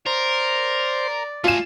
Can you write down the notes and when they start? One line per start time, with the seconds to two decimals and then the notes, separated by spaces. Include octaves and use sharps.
0.06 A#4 C5 D5
1.44 A3 F4 G#5 E7